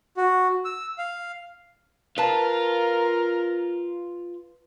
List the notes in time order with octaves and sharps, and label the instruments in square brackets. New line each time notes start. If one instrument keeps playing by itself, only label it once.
[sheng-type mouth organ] F#4
E6
F5
[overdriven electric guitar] F4 [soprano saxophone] A#4 [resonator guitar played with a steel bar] B4 A5